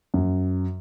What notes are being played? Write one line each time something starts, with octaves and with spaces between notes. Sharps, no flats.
F#2